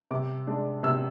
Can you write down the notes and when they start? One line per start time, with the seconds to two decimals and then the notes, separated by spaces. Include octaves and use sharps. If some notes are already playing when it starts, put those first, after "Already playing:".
0.11 C3 D6
0.47 G#3 D4
0.83 C3 E6